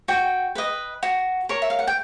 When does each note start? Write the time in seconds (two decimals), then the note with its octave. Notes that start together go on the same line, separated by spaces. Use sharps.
0.08 F#4 G5
0.55 B4 D#5
1.03 F#4
1.49 A#4 C#5
1.62 E5
1.70 F5
1.79 F#5
1.87 G5